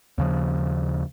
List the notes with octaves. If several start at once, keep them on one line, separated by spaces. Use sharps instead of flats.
D#2 C#3 F3